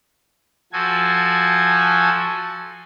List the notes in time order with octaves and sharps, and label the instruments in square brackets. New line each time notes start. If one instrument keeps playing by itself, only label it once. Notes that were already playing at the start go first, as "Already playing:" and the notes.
[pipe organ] F3 F#4 A4 G#5